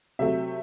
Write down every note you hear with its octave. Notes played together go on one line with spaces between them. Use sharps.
C3 F#3 A3 E5